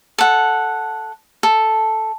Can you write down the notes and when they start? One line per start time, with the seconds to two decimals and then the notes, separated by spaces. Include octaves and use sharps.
0.18 A4 F#5
1.43 A4